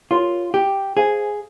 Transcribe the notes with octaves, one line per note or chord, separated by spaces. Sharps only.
F4 G4 A#4 C#5 F5 C6
G4
G#4 C5 F5 G#5